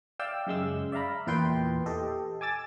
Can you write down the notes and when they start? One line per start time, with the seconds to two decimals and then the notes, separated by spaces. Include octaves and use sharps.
0.19 D5 E5 F5 G5 E6
0.47 F#2 C#3 G#3 E6
0.92 D5 E5 F5 A#5 B5
1.27 E2 A#2 E4 B4 G5 C6
1.86 G4 A4 D#5
2.41 G#5 D6 E6 A6